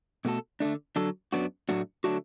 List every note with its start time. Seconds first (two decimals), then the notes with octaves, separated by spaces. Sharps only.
0.25 B2 A3 F#4 A4
0.60 D3 A3 D4
0.96 D3 F#3 D4 A4
1.33 F#2 F#3 B3 D4 F#4
1.69 A2 F#3 A3 D4 F#4
2.04 D3 F#3 A3 D4 F#4